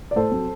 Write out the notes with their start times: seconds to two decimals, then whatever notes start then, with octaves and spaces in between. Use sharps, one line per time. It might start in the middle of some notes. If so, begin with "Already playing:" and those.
0.11 D5
0.16 A2 A4 C5
0.31 F#3 C4